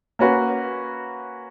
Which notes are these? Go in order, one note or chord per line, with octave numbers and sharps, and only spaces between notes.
A#3 C#4 F#4 B4